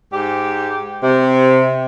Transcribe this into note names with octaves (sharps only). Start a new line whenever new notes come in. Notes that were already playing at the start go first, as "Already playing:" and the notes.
G#2 G4
C3